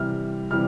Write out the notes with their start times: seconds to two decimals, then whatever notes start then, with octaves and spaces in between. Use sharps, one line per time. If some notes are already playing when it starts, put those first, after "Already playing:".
Already playing: C3 E3 G3 F6
0.51 C3 E3 G3 F6